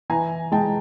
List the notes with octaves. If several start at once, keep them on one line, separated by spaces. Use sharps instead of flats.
E3 G#5 A#5
G#3 G5 A5